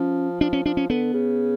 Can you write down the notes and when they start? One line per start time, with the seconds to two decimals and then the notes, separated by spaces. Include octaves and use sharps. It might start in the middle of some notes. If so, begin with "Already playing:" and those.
Already playing: F3 C#4
0.41 F3 D4
0.53 C#4
0.66 F3 D4
0.77 C#4
0.90 D3 B3
1.14 C#3